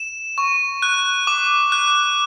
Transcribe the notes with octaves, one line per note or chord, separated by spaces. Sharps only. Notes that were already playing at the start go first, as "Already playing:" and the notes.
Already playing: E7
C#6
F#6
D6
F#6